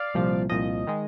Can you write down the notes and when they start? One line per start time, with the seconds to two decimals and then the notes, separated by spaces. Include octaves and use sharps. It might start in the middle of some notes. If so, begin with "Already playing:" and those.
Already playing: D5 F5
0.14 C2 A#2 F3
0.49 C2 A#2 F3 D#5
0.87 D#3 G#3